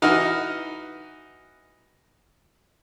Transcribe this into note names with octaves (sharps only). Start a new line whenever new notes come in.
E3 D#4 F#4 F6